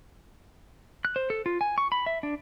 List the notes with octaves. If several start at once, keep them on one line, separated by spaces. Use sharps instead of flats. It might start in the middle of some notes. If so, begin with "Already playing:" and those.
F#6
C5
A4
F4
G#5
C#6
B5
E5
D4